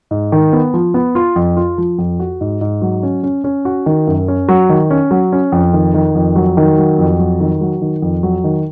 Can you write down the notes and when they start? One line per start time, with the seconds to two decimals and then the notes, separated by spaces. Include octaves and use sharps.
0.11 G#2
0.32 D#3
0.53 B3
0.74 F3
0.94 B3
1.15 F4
1.36 F2
1.57 F4
1.78 F3
1.98 F2
2.20 F#4
2.41 G#2
2.61 G#2
2.82 F#3
3.03 C#4
3.23 C#4
3.44 C#4
3.65 F#4
3.86 D#3
4.07 F#2
4.28 C#4
4.48 F#3
4.69 D#3
4.90 C#4
5.11 F#3
5.32 C#4
5.52 F2
5.73 D#3
5.94 D#3
6.15 F2
6.36 F#3
6.57 D#3
6.78 F#3
6.98 F2
7.19 F#3
7.40 D#3
7.61 F#3
7.82 D#3
8.02 F2
8.23 F#3
8.44 D#3